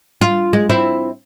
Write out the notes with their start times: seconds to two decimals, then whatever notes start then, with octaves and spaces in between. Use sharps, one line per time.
0.21 F4
0.53 G#3
0.70 C4 E4